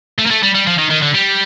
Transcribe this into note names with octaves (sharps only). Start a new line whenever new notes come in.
A3
A#3
A3
G3
G3
F3
D#3
D#3
D3
G3